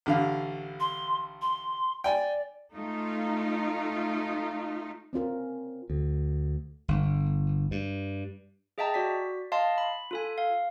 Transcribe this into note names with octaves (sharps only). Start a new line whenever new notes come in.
A1 D3 F5
C6
C6
D5 G5 G#5
A3 D#4 F4
C4 C#4 F4 A#4
D2
G1
G2
G#4 D#5 E5 G5 A5 A#5
F#4 D5 B6
D#5 F5 A5 C6
B5
F4 A4 G#5
F5